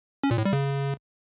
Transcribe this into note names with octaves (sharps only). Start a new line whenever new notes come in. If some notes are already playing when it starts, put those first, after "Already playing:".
C#4
A#2
A2
G3
C#3